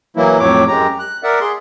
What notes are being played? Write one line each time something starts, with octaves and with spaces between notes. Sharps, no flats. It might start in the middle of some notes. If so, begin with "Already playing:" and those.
E3 F#3 A#3 E4
F2 A2 F#3 C#5 D6
F#2 G#3 G4 A#5
F#6
A#4 D5 E5 F#5
G#4 C6